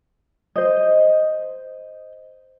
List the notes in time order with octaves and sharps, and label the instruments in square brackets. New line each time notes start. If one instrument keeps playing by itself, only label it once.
[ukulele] C5 D#5